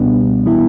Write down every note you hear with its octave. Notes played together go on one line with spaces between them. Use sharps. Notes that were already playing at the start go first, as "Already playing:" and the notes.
Already playing: C#2 B2 G3 B3 D4
E3 B3 E4